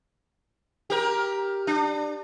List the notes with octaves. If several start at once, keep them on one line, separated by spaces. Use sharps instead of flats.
G4 A#4
D4